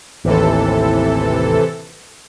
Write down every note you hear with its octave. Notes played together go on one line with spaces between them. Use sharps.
A1 D#2 C3 E3 A4